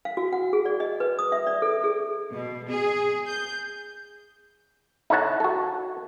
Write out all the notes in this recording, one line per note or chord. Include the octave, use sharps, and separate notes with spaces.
F5
F#4
F#5
G#4
D5
D#5
B4
D#6
E5
D5
A4
G#4
B2
G#4
G6
D#4 E4 A4 C#5 F#5 A5
F#4 A4